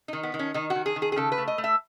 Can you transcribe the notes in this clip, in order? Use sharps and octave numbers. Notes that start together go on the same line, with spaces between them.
D#3 D#4
B3
D#3
C#4
D#3 D#4
F#4
D#3
G#4
D#3
G#4
G#4
C#3 A4
B4
A3
D#5
A3
E5